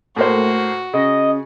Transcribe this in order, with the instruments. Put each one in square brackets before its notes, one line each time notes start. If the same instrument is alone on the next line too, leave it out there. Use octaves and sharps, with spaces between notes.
[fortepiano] A2 A#3 C5 [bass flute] A3 [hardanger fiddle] F#4
[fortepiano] C#3 [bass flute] C#4 [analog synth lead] D#5